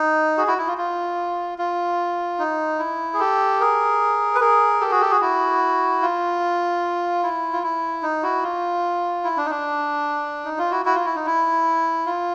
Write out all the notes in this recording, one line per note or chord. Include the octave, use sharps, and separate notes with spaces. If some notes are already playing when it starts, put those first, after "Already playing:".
Already playing: D#4
F#4 G#4
E4 F#4
E4
F4
F4
F4
D#4
E4
G#4
G4 A4
G#4 A#4
B4
G#4 A#4
G4 A4
F#4 G#4
G4 A4
F#4 G#4
E4 F#4
F4
E4
F4
E4
D#4
E4 F#4
F4
E4
D4
D#4
D4
D#4
F4
E4 F#4
E4 F#4
F4
E4
D#4
E4
F4